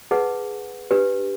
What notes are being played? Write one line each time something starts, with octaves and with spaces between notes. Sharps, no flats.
D#4 G#4 B4 F#5
D4 G4 B4